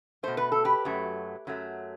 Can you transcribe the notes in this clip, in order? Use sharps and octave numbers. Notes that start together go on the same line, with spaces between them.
B2 A3 C5
B4
A4
G4 B4
F#2 F#3 A3
F#2 F#3 A3